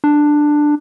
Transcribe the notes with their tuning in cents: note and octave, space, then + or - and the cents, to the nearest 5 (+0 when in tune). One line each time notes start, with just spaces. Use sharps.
D4 +10